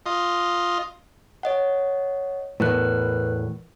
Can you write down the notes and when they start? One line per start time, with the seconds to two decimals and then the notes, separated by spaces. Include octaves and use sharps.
0.06 F4 D#5
1.43 C#5 D#5 F#5
2.60 E2 A2 A#4 B4 F#6